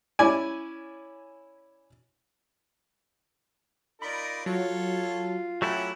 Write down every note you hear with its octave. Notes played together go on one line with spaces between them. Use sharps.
C#4 E4 D5 G#5
D#4 F4 A#4 D5 B5
F#3 F4 A4 C#5
F#3 A3 C#4 E4 G4 F#5